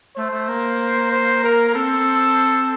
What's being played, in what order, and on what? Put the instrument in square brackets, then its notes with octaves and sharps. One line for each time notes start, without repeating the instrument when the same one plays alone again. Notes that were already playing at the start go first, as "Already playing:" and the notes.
[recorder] A3 [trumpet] C5
[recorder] A3
A#3
[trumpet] C5
A#4
[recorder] C4 [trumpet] A4